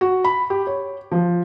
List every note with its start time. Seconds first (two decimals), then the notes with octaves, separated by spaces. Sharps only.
0.01 F#4
0.24 B5
0.50 G4
0.67 C#5
1.12 F3